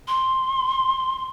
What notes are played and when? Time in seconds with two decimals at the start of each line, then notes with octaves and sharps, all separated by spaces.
0.07 C6